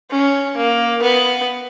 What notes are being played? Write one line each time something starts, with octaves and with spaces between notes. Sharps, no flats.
C#4
A#3
B3